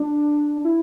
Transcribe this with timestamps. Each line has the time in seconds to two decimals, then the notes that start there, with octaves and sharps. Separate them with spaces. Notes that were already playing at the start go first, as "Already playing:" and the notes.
Already playing: D4
0.64 E4